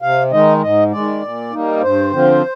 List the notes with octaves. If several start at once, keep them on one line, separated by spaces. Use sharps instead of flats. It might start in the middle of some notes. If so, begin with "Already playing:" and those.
C3 F5
D#3 G#3 D#4 D#5
G#2 D#5
D#3 G#3 D5
A#2
G3 A#3 D#4
G2 C5
D3 F3 C4 F4